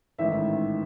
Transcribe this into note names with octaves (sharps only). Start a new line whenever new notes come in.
A1 G#2 D#3 E5